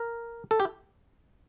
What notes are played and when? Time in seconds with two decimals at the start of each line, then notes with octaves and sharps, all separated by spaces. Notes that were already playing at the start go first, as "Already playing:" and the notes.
Already playing: A#4
0.51 A4
0.60 G4